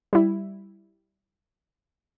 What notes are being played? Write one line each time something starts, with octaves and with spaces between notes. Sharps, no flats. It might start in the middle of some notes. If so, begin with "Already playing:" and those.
G3 E4